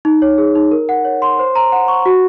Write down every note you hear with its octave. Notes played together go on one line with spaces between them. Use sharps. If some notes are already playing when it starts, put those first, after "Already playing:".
D#4
C#5
G#4
D#4
A#4
F#5
C#5
C6
C5
A#5
F#5
C#6
F#4